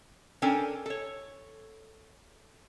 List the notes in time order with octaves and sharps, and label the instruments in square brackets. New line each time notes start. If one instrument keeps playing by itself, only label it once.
[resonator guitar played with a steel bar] C#4 D4 A4 A#4 G5 G#5
A4 C#5